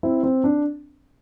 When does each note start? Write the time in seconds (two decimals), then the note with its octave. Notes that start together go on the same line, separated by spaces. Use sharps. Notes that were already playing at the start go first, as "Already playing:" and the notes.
0.03 C4 E4
0.23 C4
0.44 D4